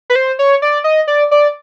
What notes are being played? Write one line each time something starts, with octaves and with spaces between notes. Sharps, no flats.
B4
C5
C#5
D5
D#5
D5
D5